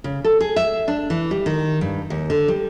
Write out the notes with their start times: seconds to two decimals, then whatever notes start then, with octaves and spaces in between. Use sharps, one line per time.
0.04 C#3
0.24 A4
0.41 G#4
0.56 E5
0.88 D4
1.10 E3
1.31 G3
1.46 D#3
1.81 G2
2.10 D#2
2.30 D3
2.48 G3